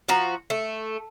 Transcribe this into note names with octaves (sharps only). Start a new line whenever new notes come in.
F3 F#4 A#5
A3